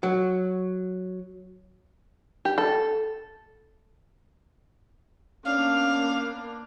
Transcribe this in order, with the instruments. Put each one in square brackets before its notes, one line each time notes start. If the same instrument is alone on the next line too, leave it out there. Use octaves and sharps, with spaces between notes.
[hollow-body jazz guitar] F#3
[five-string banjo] G4
A4
[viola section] A#3 B3 D4 [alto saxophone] C#4 [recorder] F5